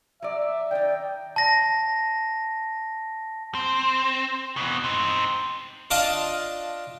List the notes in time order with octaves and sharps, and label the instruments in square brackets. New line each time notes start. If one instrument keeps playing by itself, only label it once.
[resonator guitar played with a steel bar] F#3 D5 [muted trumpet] E5
[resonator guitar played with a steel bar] D#3 D#4 [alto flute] D5 [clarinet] G5
[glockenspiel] A5 A#6
[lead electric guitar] C4
B2 E3
C4 D#4
[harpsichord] D4 F4 D#5 A5